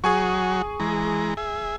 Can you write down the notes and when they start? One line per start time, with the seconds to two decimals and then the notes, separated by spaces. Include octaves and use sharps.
0.04 F#3 F#4 G#4 G#5 C#6
0.80 E3 G#3 A#5
1.37 G#4 E5